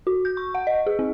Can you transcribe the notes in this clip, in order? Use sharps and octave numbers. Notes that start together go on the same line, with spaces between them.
F#4
G6
C#6
F#5
D#5
G#4
C4